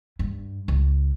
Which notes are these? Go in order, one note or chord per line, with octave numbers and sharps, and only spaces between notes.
G2
C#2